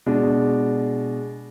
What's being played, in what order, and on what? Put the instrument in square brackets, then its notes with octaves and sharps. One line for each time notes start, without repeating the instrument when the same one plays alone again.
[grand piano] B2 G#3 D4